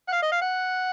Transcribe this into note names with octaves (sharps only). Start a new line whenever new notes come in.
F#5
F5
D#5
F5
F#5